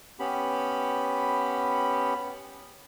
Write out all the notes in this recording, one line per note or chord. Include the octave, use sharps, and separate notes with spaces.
B3 C#4 G4 B5